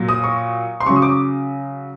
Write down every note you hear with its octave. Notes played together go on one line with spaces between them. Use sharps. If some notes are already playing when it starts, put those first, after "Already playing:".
Already playing: A#2 F#3
D#6
C#6
C6
C#3 F#3 C#6
D#6
D6